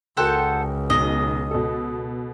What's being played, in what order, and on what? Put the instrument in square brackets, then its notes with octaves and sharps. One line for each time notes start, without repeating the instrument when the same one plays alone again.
[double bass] C#2 [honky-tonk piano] F#4 A#4 G5 [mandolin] A4 C5 F#5
[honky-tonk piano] B1 [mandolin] D#5
[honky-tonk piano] B2 A4